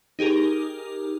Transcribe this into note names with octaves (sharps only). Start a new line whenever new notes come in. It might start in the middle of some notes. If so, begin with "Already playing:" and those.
D#4 G4 G#4 A#4